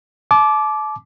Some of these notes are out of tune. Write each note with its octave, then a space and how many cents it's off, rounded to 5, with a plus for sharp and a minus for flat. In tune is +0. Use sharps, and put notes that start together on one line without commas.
A5 -35 D6 +0